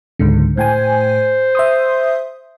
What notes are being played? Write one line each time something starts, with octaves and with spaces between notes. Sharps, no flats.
C#2 G#2 D3
A2 C5 G5 G#5
E5 C6 D#6